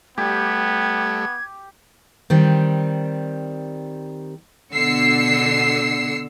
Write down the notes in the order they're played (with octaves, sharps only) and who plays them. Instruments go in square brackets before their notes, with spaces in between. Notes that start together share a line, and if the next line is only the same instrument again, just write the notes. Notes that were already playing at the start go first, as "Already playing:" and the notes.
[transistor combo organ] G3 A3 [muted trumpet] B3 [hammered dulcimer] G4 [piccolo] G#6
[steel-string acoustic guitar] D#3 G3 C4
[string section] B2 D3 E6 C7 C#7